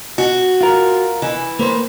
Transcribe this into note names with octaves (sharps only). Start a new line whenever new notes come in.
F#4
F4 A#4
E3
A#3 B4 C5